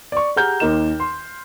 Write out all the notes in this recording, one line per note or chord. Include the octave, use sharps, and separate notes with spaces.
D5 C#6
G4 G#4 F#5 A#5 F6 G6
D#2 D#3 A#4 D#5 E7
C6